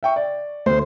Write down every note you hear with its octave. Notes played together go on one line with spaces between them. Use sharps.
E5 G5 C#6
D5
D2 C5